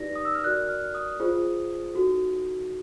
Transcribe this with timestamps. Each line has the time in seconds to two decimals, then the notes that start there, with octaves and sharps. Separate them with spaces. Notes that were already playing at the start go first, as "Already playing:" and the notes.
Already playing: D#4 G4 B4 D5 A#6
0.16 D#6
0.25 E6
0.35 F6
0.44 F#4 A#4 D5 F#6
0.69 F6
0.95 D#6
1.20 F4 G#4 C5
1.94 D#4 F#4 A4